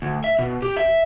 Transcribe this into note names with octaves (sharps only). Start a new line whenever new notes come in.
D2
E5
B2
G4
E5